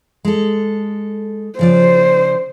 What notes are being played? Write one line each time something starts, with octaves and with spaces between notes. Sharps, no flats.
G#3 A4
C#3 F3 C5 D5